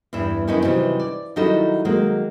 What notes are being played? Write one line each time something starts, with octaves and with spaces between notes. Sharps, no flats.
E2 G2 E3 E5
F#2 D#3 B3 D#4 E4
C3 D#3 E3 F#3 G3
D5
D#3 F#3 G3 D#4 E4 A4
D#3 F#3 G#3 A#3